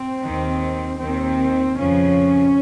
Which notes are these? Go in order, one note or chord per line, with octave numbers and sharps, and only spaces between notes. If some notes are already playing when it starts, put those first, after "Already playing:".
Already playing: C4
D#2 D#3
D#2 D#3 C4
F2 C#3 F3 C#4